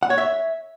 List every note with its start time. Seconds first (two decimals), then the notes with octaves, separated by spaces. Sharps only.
0.03 F#5
0.10 C#5
0.18 E5